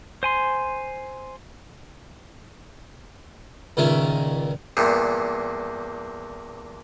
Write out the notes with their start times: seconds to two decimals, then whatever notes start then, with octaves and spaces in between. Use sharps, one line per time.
0.23 C5 G#5 C6
3.77 C#2 A#2 D#3 C#4 A#4 E5
4.77 E2 G2 A#2